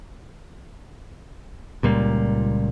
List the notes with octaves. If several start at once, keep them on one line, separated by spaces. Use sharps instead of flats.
C#2 A#2 G3 A#3